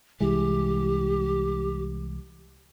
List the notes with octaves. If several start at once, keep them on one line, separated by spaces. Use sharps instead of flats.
C2 E3 G#3 G4